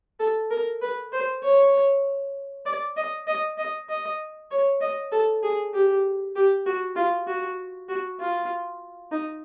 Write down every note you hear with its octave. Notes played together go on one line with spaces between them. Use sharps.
A4
A#4
B4
C5
C#5
D5
D#5
D#5
D#5
D#5
C#5
D#5
A4
G#4
G4
G4
F#4
F4
F#4
F#4
F4
D#4